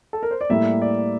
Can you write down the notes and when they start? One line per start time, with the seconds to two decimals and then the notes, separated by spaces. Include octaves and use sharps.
0.13 A4
0.23 A#4
0.31 C5
0.41 D5
0.50 A2 G3 A#3 E4 G4 E5
0.82 D5